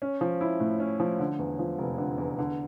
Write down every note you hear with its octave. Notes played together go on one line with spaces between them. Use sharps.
C#4
F3
E4
A2
C#4
F3
D3
E2
F3
F1
D3
E2
D3